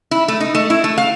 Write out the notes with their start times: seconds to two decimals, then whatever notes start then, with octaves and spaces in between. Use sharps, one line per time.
0.11 E4
0.28 A3
0.40 D#4
0.55 A3
0.70 E4
0.84 A3
0.98 F5